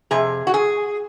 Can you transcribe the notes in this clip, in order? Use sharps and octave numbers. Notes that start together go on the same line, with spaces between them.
F2 C3 G#4
F#4
G#4